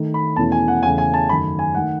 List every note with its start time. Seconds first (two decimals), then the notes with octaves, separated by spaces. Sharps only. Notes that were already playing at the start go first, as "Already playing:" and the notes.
Already playing: D#3 A3 D#4
0.14 B5
0.36 E2 B2 A3 C#4 E4 A5
0.52 G#5
0.68 F#5
0.83 E2 C#3 E3 A3 G#5
0.98 G#5
1.14 A5
1.29 F#2 D#3 A3 B5
1.59 G#5
1.75 D#3 A3 F#5